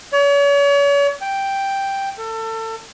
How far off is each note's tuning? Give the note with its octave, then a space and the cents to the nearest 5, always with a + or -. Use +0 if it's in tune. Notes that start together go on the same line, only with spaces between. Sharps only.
C#5 +40
G5 +0
A4 +30